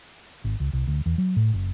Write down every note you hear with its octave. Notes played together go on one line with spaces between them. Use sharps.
G#1
C#2
C2
D2
E2
F#3
A2
F#1